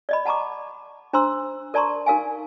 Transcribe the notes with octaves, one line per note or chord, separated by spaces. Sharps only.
D5 D#5 B5
F#5 A5 A#5 C#6 D6
D4 C5 A#5 C6 E6
A#4 D5 A5 A#5 C6 C#6
D#4 A#4 F5 G#5